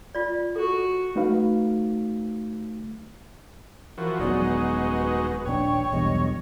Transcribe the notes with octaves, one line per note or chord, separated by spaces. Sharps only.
F4 D5
F#4 A4
A3 D#4 F#4 B4 F5
E3 F3 F#4 A#4
D#1 F#3 G#3 B3 D#4 F#4 D5
B4
D#1 A#1 D4 C#5 G5
B1 E2 G2 D#5